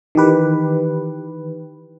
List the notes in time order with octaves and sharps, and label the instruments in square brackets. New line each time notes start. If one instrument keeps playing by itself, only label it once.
[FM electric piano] D#3 E3 G4 B4